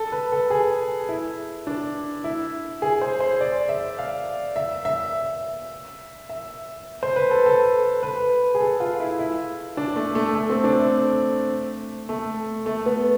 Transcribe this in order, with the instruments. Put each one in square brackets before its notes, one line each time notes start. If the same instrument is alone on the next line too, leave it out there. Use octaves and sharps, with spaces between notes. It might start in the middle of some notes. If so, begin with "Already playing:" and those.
Already playing: [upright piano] A4
B4
A4
G#4
E4
D4
E4
G#4
C5
C5
D5
E5
F5
E5
E5
E5
C5
B4
A4
A4
B4
G#4
A4
F4
E4
E4
D4
A3
A3
A3
C4
D4
A3
A3
A3
B3